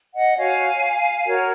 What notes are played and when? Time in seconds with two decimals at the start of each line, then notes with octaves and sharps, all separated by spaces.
0.14 D#5 F#5
0.36 F#4 C#5 F5 G#5
1.26 F#4 A#4 C#5